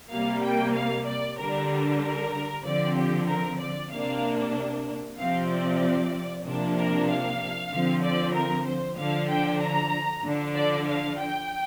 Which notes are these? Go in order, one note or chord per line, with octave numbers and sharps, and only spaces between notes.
C3 G3 A#3 F5
G5
F5
D5
D3 G3 D4 A#4
A#4
D3 F3 C4 D5
G4
A#4
D5
C3 A#3 D4 F5
C3 F3 C4 F5
D5
C3 F3 A#3 D4
A#4
F5
D3 F3 C4
D5
A#4
C5
D3 F3 D4 F5
G5
A#5
D3 F3 D4
D5
F5
G5